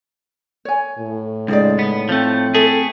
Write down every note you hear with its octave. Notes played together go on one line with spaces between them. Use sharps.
C#5 G#5
A2
C#2 G#3 D#4 G#4 D5
B3
F3 A3 C4
A3 G#4 A4